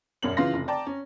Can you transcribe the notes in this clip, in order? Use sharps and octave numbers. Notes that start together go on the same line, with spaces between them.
E1 F#2 C#4 C#5 F#7
C#3 E3 F4 F5 C6 A#6
F1
D5 G5 A5 A#5 D6
C#4